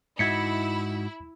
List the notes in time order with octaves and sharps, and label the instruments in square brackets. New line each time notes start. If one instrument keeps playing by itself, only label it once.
[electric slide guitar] G#2 D#4 F#4 [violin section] E4 [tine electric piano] G#6 B6 C#7